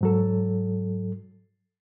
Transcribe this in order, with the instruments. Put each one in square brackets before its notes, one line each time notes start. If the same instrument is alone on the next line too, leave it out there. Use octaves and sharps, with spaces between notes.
[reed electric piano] G#2 F#3 A4